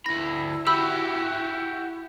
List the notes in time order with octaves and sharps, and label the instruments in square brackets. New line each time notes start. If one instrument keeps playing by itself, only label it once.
[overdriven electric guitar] D2 B5 [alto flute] E4 [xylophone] A#6
[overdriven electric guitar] F#4 G4 [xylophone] B5 E6